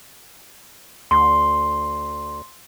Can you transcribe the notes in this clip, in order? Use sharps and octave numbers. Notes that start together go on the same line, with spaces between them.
D2 C6